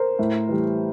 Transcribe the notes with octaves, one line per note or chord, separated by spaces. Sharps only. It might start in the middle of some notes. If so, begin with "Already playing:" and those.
Already playing: A#4 C5
A2
E3 G3